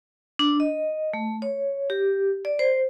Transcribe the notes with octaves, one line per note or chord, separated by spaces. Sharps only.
D4
D#5
A3
C#5
G4
D5
C5